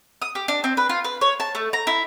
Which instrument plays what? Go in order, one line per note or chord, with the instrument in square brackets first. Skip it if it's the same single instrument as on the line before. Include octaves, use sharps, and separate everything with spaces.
[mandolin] D#6
G4
D4
C4
B4
F4
B4
C#5
A5
A3
A#5
E4